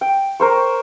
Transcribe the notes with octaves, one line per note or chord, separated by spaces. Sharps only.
G5
A#4 C5 C#6